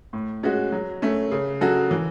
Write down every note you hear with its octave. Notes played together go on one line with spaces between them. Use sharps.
A2
G#3 C#4 F#4
F#3
A3 C#4
C#3
F#3 C#4 F#4 A4
E3